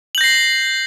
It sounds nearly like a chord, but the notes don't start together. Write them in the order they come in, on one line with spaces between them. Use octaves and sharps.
F#7 G6 A#6 C7